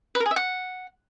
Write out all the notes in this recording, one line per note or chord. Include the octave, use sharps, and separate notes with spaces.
B4
A#4
G#4
E5
F#5